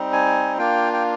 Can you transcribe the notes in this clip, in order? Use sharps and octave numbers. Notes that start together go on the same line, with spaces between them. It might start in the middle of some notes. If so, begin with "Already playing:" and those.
Already playing: G3 C4 D#4
G#5
A#3 D4 F4 G5
G5